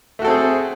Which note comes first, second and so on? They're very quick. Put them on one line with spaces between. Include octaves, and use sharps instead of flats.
A3 F#4 A4 C4 G#4